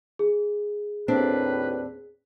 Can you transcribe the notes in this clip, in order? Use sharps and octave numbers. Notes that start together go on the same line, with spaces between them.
G#4
D#2 A2 C4 D4 B4